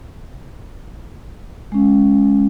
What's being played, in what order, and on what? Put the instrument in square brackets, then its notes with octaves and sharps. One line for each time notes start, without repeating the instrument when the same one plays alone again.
[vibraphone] G#3 C#4